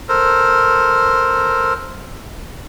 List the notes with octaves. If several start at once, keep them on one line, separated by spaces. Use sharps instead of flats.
A4 A#4 C5